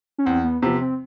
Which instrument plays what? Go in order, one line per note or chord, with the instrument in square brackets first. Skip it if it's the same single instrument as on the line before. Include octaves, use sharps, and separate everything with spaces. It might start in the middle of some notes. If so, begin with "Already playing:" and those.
[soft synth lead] C#4
[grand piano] E2 [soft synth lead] C4
[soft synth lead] B3
[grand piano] C3 F3 [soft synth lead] B3
[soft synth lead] C4